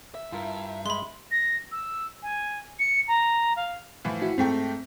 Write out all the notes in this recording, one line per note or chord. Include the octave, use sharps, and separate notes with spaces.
E5
G2 E4 F4 A#4
G#3 B5 C6
A#6
E6
G#5
C#7
A#5
F5
A2 E3 F3
E4 F#4
G#2 A3 C4 G5